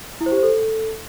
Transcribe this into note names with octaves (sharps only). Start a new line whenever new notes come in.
E4
C5
G4
C5
A4